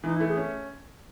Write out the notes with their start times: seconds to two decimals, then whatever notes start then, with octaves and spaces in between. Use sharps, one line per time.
0.04 E3 D#4
0.16 E4
0.20 A3
0.28 G#4
0.37 C#4